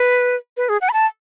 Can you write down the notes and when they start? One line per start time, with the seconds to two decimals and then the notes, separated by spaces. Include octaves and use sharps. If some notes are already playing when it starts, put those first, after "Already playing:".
Already playing: B4
0.57 B4
0.69 G#4
0.81 F#5
0.89 B5
0.93 A5